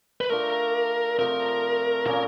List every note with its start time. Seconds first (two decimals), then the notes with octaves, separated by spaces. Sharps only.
0.21 B4
0.29 A3 D4 F4 A#4
1.18 C3 F3 A3 A#4
2.06 A#2 F3 A#3 C#4 A#4